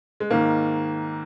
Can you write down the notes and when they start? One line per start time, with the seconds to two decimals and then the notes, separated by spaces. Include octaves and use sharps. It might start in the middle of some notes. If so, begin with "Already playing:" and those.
0.20 G#3
0.30 G#2 D#3 A#3